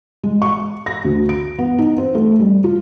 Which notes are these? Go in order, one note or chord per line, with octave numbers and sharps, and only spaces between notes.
G#3
C#6
A#6
D2
D7
B3
D#4
C4
A3
G3
F4